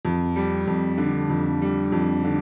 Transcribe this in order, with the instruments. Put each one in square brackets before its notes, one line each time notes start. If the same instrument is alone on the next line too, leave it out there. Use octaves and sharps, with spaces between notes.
[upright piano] F2
G3
F2
D3
F2
G3
F2
D3